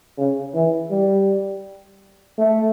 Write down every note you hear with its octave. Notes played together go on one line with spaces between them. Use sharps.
C#3
E3
G3
A3